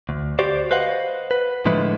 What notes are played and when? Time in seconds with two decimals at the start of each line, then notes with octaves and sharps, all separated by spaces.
0.09 D2
0.39 F#4 G4 C5 D5
0.71 B4 C5 D#5 F5 F#5
1.31 B4
1.65 A2 D3 F3 G#3 E4 B4